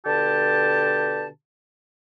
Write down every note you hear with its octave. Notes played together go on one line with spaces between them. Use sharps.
B2 D3 G4 A5